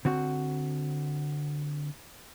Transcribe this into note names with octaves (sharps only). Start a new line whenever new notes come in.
D3 C4 F#4